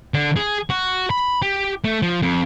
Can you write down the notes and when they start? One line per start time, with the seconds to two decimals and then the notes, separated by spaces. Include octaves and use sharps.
0.14 D3
0.36 G#4
0.70 F#4
1.11 B5
1.42 G4
1.84 A3
2.02 F3
2.22 F2